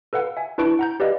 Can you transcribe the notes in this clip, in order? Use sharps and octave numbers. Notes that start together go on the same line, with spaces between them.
A4 B4 F5 F#5
E5 G#5
D4 E4 B4 A5 C#6 D7
F#5 A#5 G6
G4 B4 D5 D#5 F5